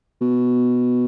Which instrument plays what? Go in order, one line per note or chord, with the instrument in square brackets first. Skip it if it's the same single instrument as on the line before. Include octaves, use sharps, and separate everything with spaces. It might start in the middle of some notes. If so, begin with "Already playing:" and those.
[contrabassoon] B2